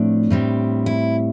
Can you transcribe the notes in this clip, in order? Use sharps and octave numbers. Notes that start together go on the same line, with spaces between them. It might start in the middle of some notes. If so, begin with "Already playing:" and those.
Already playing: A2 F3 A3 C4 D4
A2 G3 C4
E4